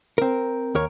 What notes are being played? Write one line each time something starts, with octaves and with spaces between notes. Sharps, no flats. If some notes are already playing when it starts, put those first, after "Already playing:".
C4 A#4
D#2 A#4 C#5